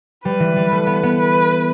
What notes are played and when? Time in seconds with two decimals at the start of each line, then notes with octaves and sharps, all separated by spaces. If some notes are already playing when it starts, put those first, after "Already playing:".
0.24 G3 B4
0.40 E3
0.56 G3
0.71 A3
0.87 B3
1.03 B3
1.19 B4